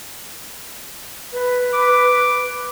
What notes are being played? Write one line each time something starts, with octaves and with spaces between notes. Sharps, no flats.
B4
D6